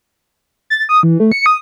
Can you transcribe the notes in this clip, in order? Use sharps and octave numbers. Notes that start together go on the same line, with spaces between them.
A6
D#6
E3
A3
C#7
D#6